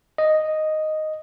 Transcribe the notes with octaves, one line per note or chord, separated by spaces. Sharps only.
D#5